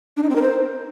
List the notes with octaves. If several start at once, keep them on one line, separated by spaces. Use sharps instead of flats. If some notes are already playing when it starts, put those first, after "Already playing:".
D4
D#4
C4
A#4
C5